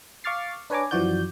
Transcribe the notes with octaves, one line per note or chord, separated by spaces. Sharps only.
F5 C#6 D6 F6 A6 C7
D4 B4 C#5 G#5 A#5 D6
F#2 E3 F3 F#4 D5 G6